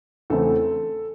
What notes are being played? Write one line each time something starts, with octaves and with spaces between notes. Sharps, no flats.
E2 C#3 E3 A3 C4 A4